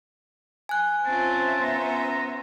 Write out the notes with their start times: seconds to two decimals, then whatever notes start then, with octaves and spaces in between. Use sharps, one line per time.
0.69 G#5 F#6
1.05 C4 C#4 F4 C5 E5 A5
1.63 B3 C#4 A#5